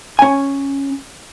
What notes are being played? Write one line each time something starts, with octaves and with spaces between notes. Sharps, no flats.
C#4 G#5